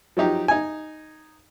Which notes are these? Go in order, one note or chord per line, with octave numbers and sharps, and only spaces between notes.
F3 F#3 D#4 G4
D#4 G#5